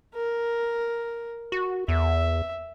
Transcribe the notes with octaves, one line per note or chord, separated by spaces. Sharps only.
A#4
F#4
E2 E5